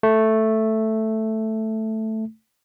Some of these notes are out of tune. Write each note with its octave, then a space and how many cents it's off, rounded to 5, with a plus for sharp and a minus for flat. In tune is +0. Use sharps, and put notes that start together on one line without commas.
A3 +0